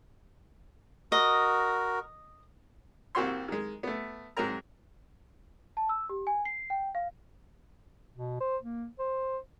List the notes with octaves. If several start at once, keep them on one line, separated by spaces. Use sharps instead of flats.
F#4 A#4 D#5
C2 A#3 C4 F#4 C#5 C6
D#3 G#3
A3 B3
G#2 F#3 C4 A#4 A#5
A5
E6
G4
G#5
C7
G5
F5
B2
C5
A#3
C5